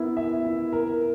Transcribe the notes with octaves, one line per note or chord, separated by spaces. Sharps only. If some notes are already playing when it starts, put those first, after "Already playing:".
Already playing: B3 E4 A#4
E5
E4
A#4